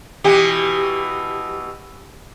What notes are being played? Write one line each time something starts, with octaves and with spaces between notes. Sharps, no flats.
B2 E3 G4